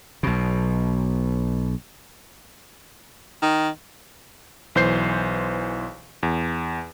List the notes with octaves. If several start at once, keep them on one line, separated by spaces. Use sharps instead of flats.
B1 B2
D#3
B1 E3 C5 G6 C7
E2